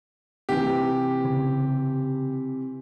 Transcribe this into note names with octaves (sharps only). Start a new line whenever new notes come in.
C3 E3 G4
C#3